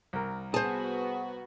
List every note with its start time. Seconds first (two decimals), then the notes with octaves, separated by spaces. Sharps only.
0.13 C2 A#4
0.54 B3 F#4 G#4 C5 A5